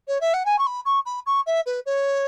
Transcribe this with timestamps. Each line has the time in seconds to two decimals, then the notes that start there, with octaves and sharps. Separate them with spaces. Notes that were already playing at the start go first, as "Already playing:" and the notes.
0.08 C#5
0.21 E5
0.34 F#5
0.46 G#5
0.58 C#6
0.66 B5
0.85 C#6
1.06 B5
1.26 C#6
1.46 E5
1.66 B4
1.86 C#5